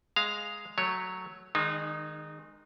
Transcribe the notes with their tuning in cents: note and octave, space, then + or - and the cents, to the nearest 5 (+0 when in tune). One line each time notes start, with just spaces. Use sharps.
G#3 +0 F5 -5 A#5 +0
F#3 +0 A3 -5 C#5 +0
D#3 +0 G#3 +0 D#4 -35